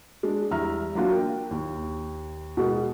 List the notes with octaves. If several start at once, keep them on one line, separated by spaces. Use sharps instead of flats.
G#3 D4
E2 G3 E5 A#5 F6
F#3 A#3 D4 F4 F#4
A#4 G5
D#2
B2 G#3 A#4